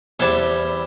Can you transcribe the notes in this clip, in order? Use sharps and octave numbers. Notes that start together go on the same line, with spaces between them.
E2 E3 G3 C4 A5